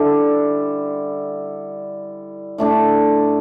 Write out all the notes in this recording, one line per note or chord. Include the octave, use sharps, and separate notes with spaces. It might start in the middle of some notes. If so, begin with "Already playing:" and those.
Already playing: D3 G3 E4 A4
A2 A3 D4